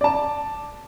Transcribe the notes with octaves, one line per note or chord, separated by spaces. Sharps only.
D5 A5